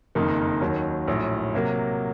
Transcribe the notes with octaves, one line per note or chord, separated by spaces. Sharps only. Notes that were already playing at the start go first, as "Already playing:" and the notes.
F#1 F2 D#3 A#3 D#4
D#2 D#3 F#3
A#1 A2 F#3
C3 F#3 A#3